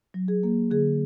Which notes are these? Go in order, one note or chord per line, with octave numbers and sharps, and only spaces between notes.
F#3
G#4
A#3
D3 G#4